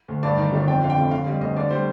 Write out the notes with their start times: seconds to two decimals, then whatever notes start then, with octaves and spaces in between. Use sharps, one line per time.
0.08 D2
0.23 G2 D5
0.38 D#3
0.52 G1
0.67 F2 G5
0.82 D3 F5
0.90 G5
0.97 F1
1.11 D3 F5
1.26 G3 D#5
1.41 D2 D#5
1.56 D3 D5
1.70 G3 C5